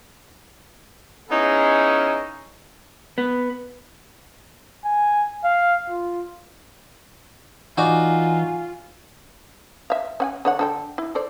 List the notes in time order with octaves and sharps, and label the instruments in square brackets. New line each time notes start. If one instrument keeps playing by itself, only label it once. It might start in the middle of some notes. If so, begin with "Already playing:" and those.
[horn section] B3 C#4 D#4 E4 G#4
[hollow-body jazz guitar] B3
[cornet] G#5
F5
F4
[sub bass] E3 [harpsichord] D#4 F#4 D5 [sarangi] F4 [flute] G#5
[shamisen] E5 F5
C#4 F#5 G#5
D3 C#5 F#5
D3 A4 G5
E4
A4 C5 D5